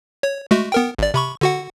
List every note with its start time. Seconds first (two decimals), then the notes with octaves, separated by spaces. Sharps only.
0.23 C#5
0.51 G#3 A3 F#4
0.72 B3 A#4 G5
0.99 G#1 D5
1.14 C3 B5 C#6
1.41 D3 F#4 F#5